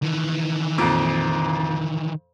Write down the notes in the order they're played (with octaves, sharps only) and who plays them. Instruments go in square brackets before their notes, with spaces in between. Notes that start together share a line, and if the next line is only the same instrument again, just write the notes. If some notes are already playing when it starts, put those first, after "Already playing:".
[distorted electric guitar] D#3 E3
[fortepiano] F2 A#2